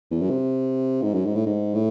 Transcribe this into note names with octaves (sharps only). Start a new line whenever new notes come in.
E2
F#2
C3
G#2
F#2
G#2
A2
G#2
A2